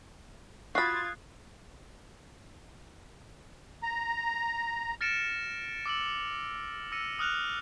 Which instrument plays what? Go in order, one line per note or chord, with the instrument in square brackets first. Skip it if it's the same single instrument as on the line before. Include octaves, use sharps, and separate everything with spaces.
[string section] F4 G#6 A6 [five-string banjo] F#4 B5 [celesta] D#6 F#6 C7
[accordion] A#5
[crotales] F6 A6 A#6 C#7 D7 E7
D6 E6 E7 F#7
E6 A#6 C#7 D#7
D#6 F6 F#6 F7